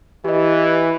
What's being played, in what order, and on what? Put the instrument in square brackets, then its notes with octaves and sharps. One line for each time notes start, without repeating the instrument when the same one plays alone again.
[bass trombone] E3 [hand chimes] G4 D#5